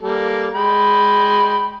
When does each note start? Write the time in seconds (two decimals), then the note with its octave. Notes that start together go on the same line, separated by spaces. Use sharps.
0.02 G3 A#3 A4
0.54 G#3 G5 B5